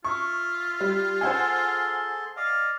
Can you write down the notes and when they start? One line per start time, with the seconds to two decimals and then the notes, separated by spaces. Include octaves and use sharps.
0.04 F4 E5 C#6
0.80 G3
1.21 G#4 A4 C5 F#5 G#5 C6
2.37 D5 D#5 F5